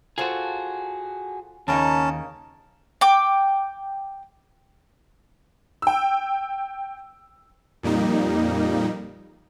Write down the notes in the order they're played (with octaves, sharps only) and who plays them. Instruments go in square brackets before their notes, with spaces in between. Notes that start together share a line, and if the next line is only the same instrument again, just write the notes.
[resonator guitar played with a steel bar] F4 A4 C5 [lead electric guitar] F#4 G#4
[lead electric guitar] D#2 [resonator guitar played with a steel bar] C#3 A#3 D#4 [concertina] C#4 A5
[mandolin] G5 D6
[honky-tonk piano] G5 E6
[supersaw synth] F2 A#2 G3 A#3 D#4